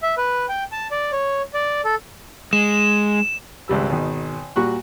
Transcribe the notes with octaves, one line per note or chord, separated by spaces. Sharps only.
E5
B4
G5
A5
D5
C#5
D5
A4
G#3 E7
G#1 C#2 G3 E6
G#1 B2 D#3
A#2 G3 F#4 C#6 F#6